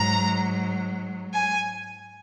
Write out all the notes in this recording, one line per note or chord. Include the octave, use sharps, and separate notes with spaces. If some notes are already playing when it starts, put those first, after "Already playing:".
Already playing: G#2 F#3 A#5
G#5